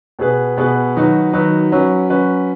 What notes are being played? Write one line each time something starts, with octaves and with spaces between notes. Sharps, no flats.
B2 B3 G#4 B4
B2 B3 G#4 B4
D#3 F#3 D#4 F#4 B4
D#3 F#3 D#4 F#4 B4
F#3 C#4 B4
F#3 C#4 B4